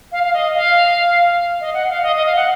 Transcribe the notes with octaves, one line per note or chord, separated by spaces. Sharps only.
F5
F5
D#5
F5
D#5
F#5
F5
D#5
D#5
F5
F#5